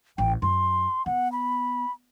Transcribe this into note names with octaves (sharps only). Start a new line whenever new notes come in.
A1 G5
F#2 C6
B3 F#5
B5